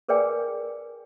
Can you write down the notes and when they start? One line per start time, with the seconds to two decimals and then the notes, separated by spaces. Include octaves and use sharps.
0.08 G#4 A#4 B4 D5 G5 G#5